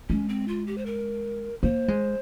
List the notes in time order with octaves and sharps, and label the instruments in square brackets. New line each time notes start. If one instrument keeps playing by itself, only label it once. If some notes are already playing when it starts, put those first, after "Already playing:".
[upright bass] G#3 [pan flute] C#4
[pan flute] C4
F4
G4
C5
A#4
[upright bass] A#3 [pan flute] C5
[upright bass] G#3